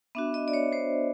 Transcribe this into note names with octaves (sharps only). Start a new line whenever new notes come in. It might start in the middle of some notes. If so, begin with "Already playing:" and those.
B3 D4 F#4 E5
D#5
D5
C#5
C5